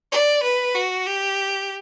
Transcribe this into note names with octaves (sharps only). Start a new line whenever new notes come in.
D5
B4
F#4
G4